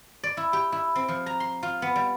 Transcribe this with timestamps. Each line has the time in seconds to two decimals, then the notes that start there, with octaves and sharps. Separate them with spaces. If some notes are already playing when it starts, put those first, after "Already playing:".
0.24 D5
0.37 E4
0.53 G4
0.72 E4
0.95 C4
1.08 F3
1.26 A#5
1.40 C6
1.63 F4
1.82 B3
1.96 G3